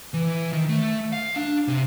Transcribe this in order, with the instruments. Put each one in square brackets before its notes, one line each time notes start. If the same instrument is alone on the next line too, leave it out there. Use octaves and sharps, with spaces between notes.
[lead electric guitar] E3
D#3
A3
F5
D4
C3